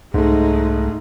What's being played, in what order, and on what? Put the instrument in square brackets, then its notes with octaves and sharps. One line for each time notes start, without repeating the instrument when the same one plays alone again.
[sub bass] C2 [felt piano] G#2 A3 [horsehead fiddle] G#3 D#4